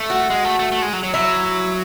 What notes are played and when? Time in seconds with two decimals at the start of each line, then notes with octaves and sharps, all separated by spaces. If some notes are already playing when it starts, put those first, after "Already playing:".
Already playing: A3
0.10 F#4
0.30 G#3
0.44 A3
0.59 A3
0.72 A3
0.82 G#3
0.93 F#3
1.03 F#3
1.14 F#3 E4